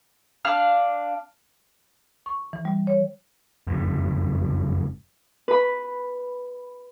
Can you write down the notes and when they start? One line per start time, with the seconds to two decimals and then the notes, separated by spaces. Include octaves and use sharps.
0.45 D4 F5 F6
2.26 C#6
2.53 E3
2.65 G3
2.87 C#5
3.67 F#1 F2 G#2
5.48 B4 B5